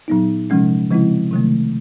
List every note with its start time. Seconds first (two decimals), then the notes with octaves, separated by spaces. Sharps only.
0.08 A#2 F#3 B3 D#4
0.50 C3 F3 G#3 C#4
0.91 C#3 F3 G#3 C4 E4
1.31 C3 D#3 F#3 A3